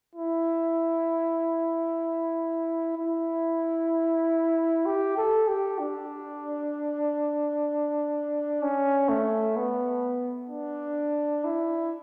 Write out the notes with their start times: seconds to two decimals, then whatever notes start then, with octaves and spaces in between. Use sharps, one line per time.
0.15 E4
2.97 E4
4.86 G4
5.17 A4
5.48 G4
5.79 D4
8.62 C#4
9.09 A3
9.56 B3
10.49 D4
11.44 E4